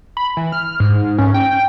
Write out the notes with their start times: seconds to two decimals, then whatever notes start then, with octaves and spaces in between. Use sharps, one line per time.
0.17 B5
0.37 E3
0.52 F6
0.80 G#2
1.18 C#4
1.34 G5